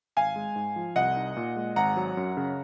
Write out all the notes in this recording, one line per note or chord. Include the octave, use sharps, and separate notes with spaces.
G#1 F5 G#5
G#3
G#2
F3
C2 D#5 F#5
D#4
A#2
G#3
G#1 F#5 A#5
F#3
F#2
C#3